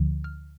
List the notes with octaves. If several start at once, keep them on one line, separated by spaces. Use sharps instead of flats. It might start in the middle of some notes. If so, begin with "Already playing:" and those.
Already playing: D2 D3 F3
F6